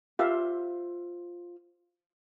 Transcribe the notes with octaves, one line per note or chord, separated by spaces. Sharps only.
F4 G4 C5 E5 F5